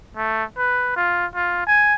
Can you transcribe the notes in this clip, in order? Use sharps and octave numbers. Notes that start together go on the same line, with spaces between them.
A3
B4
F4
F4
G#5